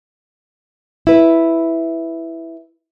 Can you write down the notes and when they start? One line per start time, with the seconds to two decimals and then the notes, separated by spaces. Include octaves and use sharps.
1.07 E4 B4